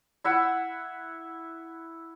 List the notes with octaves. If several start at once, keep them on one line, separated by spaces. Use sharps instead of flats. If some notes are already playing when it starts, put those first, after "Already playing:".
E4 E5 F#5